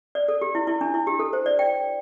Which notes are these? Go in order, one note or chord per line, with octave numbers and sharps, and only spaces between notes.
D5
A4
G4
E4
E4
D4
E4
G4
A4
C5
D5
G5